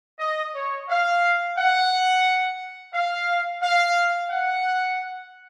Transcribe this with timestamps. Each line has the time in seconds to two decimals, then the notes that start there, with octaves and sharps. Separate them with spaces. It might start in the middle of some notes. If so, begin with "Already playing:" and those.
0.20 D#5
0.55 C#5
0.89 F5
1.57 F#5
2.93 F5
3.61 F5
4.30 F#5